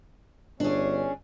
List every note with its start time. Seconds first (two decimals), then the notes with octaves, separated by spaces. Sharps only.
0.60 G1 C#4 D4 G#4